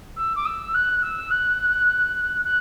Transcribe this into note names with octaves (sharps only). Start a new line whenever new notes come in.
E6
D6
E6
F#6
E6
F#6
F#6